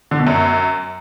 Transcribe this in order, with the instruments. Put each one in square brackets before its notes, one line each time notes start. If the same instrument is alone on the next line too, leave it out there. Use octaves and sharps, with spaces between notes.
[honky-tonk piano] D3
B2
F#2